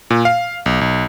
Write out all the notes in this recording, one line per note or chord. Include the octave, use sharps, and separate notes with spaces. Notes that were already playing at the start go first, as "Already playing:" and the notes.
A#2
F5
B1
B1